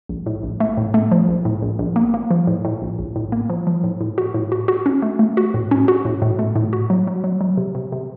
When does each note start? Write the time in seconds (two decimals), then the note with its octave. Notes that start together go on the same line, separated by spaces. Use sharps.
0.09 A#1
0.26 A2
0.43 A#1
0.60 A3
0.77 A2
0.94 A3
1.12 F3
1.28 A#1
1.45 A2
1.62 A#1
1.79 A#1
1.96 A#3
2.14 A#3
2.31 F3
2.47 A2
2.65 A2
2.82 A#1
2.99 A#1
3.16 A2
3.32 A#3
3.50 F3
3.67 F3
3.84 A2
4.01 A2
4.18 F#4
4.34 A2
4.52 F#4
4.68 F#4
4.86 C#4
5.02 A3
5.19 A3
5.37 F#4
5.54 A2
5.71 C#4
5.88 F#4
6.05 A2
6.22 A2
6.39 A3
6.56 A2
6.73 F#4
6.90 F#3
7.07 F#3
7.24 F#3
7.41 F#3
7.57 C3
7.75 C3
7.92 C3